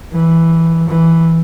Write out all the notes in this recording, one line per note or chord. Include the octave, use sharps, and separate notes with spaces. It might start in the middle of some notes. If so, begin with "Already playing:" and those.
E3
E3